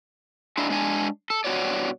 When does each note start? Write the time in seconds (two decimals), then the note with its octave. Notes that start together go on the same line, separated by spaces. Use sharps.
0.57 G#3 A#3 D4 E4
0.70 G#3 D4 G#5
1.30 A4
1.45 G2 B2 F#4 C#5 D5